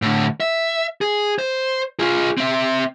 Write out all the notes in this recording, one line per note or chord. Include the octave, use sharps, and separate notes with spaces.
A2 D3
E5
G#4
C5
F4 G#4
C4 E5